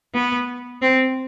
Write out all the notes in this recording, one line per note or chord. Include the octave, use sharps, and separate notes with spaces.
B3
C4